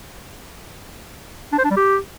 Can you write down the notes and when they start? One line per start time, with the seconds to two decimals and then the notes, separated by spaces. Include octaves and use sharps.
1.52 D4
1.59 C5
1.65 D4
1.71 G3
1.77 G4